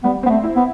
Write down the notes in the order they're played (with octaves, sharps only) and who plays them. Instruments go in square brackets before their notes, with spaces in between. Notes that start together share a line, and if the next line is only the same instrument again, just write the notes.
[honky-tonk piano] G3 [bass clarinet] B3
[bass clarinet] B3 [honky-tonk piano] C4
[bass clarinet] A3
[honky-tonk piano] E4
[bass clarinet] B3